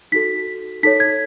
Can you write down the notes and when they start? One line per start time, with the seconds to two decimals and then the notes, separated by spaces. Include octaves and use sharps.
0.12 D#4 F#4 A4 B6
0.83 D#4 A4 C#5 B6
1.00 G#6